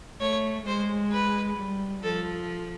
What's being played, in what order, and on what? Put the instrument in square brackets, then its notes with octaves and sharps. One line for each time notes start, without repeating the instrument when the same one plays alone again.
[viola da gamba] A3 [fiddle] C#5
[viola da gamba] G#3 [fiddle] C5
[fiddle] B4
[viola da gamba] G3
[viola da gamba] F3 [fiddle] A4